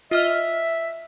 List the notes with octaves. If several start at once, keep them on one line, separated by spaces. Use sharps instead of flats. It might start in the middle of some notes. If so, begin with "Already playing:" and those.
F4 D#5 E5 F6